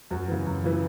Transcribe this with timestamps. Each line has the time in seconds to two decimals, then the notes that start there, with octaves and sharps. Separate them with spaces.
0.11 F#2 F#4
0.28 C#3 E3
0.46 F#2
0.64 C#3 E3